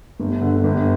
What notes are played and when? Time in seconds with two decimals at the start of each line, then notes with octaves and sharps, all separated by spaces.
0.20 G1
0.41 D3
0.64 G1